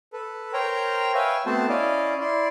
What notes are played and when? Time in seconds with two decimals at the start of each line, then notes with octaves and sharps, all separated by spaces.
0.13 A4 B4
0.53 A#4 C5 C#5 G5 A#5
1.15 B4 C#5 E5 F5 G5 G#5
1.46 A3 B3 C4 F#4 C5 A5
1.69 C#4 E4 D5 D#5 F5
2.20 E4 D5 C6